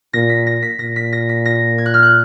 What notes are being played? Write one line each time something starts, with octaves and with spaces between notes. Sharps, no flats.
A#2 A#6
B6
A#6
B6
A#2 A#6
B6
A#6
B6
A#6
G#6
F#6
F6
F#6